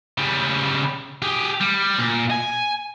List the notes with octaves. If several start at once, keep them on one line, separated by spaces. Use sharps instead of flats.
C#3 G3
G4 G#4
G3
A#2
G#5